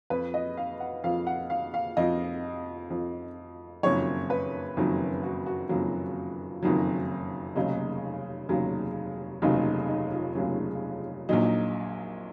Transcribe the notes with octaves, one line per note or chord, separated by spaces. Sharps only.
F2 F3 B4
D#5
F5
F#5
F2 F3 F5
F#5
F5
F5
F2 F3 D#5
F2 F3
F#1 F2 D#3 F#3 C#5
B4
F#1 F2 D#3 F#3
F#4
F#4
F#1 F2 D#3 F#3 F4
F#1 F2 D#3 F#3
F1 D#2 C#3 F#3 D#4
F1 D#2 C#3 F#3
F1 D#2 C#3 F#3 D#4
D#4
F4
F1 D#2 C#3 F#3 F4
A#1 A#2 F#3 D#4